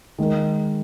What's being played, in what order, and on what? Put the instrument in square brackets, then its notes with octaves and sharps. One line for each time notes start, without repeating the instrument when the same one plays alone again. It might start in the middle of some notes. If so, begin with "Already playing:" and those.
[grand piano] D#3 G#3 D#4 A#4